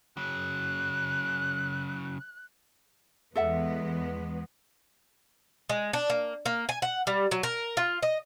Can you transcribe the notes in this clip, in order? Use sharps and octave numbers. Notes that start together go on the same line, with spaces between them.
C#3 F#3 F#6
E2 G#3 B3 A4 E5 F#5
G#3
D4
A#3
A#3
G#5
F#5
G3
F#3
A#4
F4
D#5